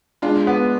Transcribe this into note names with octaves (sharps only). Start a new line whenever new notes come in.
G#3 D4 F4
B3